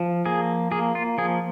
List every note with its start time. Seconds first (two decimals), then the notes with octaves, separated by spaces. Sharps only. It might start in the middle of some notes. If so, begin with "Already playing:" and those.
Already playing: F3
0.26 A#3 G#4
0.72 A#3 G#4
0.95 F4
1.18 F3 G#4